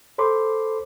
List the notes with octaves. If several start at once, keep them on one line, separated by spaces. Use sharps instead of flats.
A4 C5 B5 C6 D6